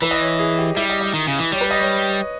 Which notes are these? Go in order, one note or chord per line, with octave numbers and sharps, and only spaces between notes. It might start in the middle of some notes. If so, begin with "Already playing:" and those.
E3 B4
D#5
C#5
G#4
G4
G3 E4
D#5
D#5
D#3
C#3
E3
G3 C#5
B4
D#5
C#5